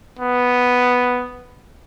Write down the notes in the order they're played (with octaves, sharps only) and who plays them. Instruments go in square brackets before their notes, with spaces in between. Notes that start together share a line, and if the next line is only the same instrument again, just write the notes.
[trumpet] B3